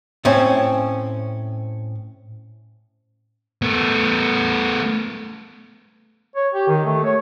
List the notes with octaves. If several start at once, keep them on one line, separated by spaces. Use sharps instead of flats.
A2 C4 C#4
A3 B3
C#5
G4
D#3
A3
C#5